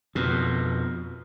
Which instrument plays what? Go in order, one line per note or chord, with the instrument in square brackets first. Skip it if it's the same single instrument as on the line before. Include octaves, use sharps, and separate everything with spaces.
[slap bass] F2 B2